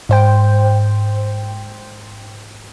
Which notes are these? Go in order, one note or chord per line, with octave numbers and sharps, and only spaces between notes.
G#2 C5 G5